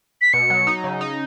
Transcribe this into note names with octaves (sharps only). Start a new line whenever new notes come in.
B6
B2 C#7
F#3
D#4
C#3
D#4